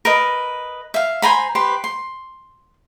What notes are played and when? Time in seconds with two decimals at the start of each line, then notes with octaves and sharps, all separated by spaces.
0.05 A#4 B4 D#5
0.94 E5 F5
1.22 C5 G#5 A#5 B5
1.55 G4 B4 C5
1.84 C6